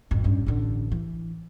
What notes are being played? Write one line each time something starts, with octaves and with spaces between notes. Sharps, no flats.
G#1 F2
A1 G2
A1 D3
E3